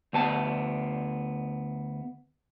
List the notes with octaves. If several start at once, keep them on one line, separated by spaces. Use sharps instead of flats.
D2 B3 A5